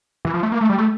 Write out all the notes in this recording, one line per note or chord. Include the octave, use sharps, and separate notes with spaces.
E3
F3
A3
A#3
A3
G3
A3